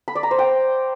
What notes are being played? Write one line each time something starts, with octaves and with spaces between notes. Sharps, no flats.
B5
D5
A#5
C5
G5